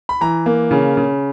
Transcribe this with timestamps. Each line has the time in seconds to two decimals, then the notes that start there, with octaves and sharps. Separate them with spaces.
0.09 B5
0.21 E3 A#5
0.46 A#3
0.71 C#3
0.97 C#3